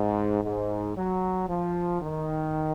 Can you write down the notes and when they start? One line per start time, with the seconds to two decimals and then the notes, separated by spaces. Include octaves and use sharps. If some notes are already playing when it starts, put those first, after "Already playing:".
Already playing: G#2
0.43 G#2
0.97 F#3
1.49 F3
2.02 D#3